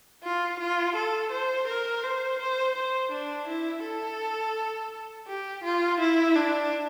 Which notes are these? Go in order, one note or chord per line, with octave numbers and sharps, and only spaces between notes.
F4
F4
A4
C5
A#4
C5
C5
C5
D4
E4
A4
G4
F4
E4
D4